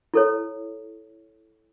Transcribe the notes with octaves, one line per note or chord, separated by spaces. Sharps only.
E4 A4 C#5